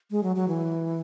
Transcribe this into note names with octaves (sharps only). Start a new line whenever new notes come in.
G#3
F#3
F#3
E3